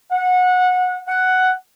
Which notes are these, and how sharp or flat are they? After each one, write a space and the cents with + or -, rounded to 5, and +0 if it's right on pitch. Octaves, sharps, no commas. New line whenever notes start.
F#5 -20
F#5 +5